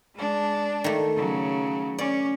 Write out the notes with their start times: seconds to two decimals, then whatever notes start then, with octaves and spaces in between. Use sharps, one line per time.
0.15 G#3 D4
0.84 D#3 A3
1.16 C#3 F#3
1.98 C#4 D5